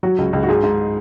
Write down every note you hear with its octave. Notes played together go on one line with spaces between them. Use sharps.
F#3 F#4
C#2
C#2
F#4
G#2 G#4
G#2